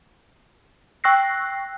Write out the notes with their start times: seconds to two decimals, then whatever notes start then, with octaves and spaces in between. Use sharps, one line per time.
1.04 G5 C#6 E6 F#6 A#6 C7